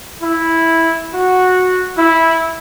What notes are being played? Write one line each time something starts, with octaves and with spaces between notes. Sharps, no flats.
E4
F#4
E4